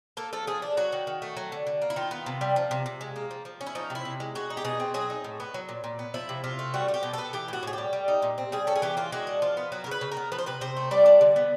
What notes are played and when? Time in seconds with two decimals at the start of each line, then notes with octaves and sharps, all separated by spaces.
0.17 A#3 A4
0.33 F3 A4
0.47 F3 G#4
0.62 D4
0.77 F#3 F#4
0.92 D#3
1.07 D#3
1.22 A3
1.37 F#3
1.52 D3
1.67 D3
1.82 A#3
1.90 E4
1.96 D#3 F4
2.11 B3
2.26 C3
2.41 G3
2.56 F3
2.71 C3
2.86 C3
3.01 G#3
3.16 A#3
3.31 F3
3.45 F3
3.61 C#4
3.67 E4
3.75 F3 D#4
3.90 C3
3.95 E4
4.05 C3
4.20 G#3
4.35 G#3 F#4
4.50 D#4
4.57 G4
4.64 B2 G#4
4.80 C4
4.94 F#3 G#4
5.10 D#4
5.24 A2
5.40 B3
5.54 F#3
5.69 A#2
5.84 A#2
5.99 B3
6.14 F3 E4
6.29 C3
6.44 C3 F4
6.59 A3
6.74 G3 F#4
6.88 D4
6.94 G4
7.03 B2
7.13 B3 A4
7.33 E3 G4
7.48 A2 F#4
7.63 A2 G#4
7.73 G3 G4
7.93 G3
8.08 D#4
8.22 A#2
8.38 C4
8.52 G3 G#4
8.67 C#4 A4
8.76 G#4
8.82 E3 G4
8.97 A#3 F4
9.12 G#3 F#4
9.27 D4
9.42 F3 F4
9.57 B3
9.72 F#3 F#4
9.84 C#3 A#4
9.91 B4
10.01 C#3
10.11 A#4
10.17 B3
10.32 F3 B4
10.38 C5
10.46 C3 B4
10.61 C3 C5
10.77 A3
10.91 G3 D5
11.06 D4
11.21 D3
11.36 B3